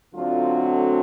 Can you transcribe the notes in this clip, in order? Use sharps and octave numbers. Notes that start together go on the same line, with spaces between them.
D2 D3 F#3 A3 C4 F4